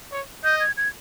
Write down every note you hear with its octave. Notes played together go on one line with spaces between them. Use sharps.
C#5
D#5 G6
G#6
G#6